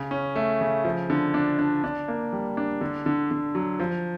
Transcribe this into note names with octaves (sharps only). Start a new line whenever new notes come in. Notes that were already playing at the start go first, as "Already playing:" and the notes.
Already playing: C#3
C#4
A3
C#3
F3
D3
D4
D4
D4
A#3
G3
D4
D3
D3
D3
F#3
F3